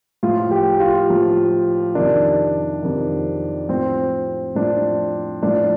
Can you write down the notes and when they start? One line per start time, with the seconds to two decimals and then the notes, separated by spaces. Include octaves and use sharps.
0.23 A2 F3 F4
0.51 G4
0.80 F4
1.10 A2 F3
1.95 F2 C3 D#3 D4
2.82 F2 C3 D#3
3.69 A2 F3 C4
4.55 A2 F3 D4
5.43 A2 F3 D4